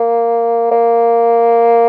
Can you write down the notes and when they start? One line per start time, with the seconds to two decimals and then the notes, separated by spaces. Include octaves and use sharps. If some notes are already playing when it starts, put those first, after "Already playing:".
Already playing: A#3
0.71 A#3